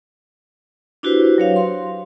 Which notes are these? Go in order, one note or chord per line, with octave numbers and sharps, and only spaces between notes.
D4 E4 F#4 G4 B4 C5
F#3 C#5 F5
C6